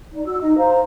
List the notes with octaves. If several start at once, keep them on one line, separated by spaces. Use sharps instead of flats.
D#4 D5
F#4 E6
D#4 D#5
C5 F5 A#5